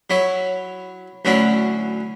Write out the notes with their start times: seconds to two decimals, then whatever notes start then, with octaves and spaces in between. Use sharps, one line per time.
0.10 F#3 E4 C#5
1.25 D2 F#3 C#4 D4 E4